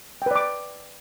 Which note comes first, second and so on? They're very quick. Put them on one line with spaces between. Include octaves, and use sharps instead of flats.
G5 B4 D5 D6